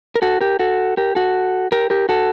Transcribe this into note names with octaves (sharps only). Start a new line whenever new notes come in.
A#4
F#4 A4
G4 A#4
F#4 A4
G4 A#4
F#4 A4
G4 A#4
G4 A#4
F#4 A4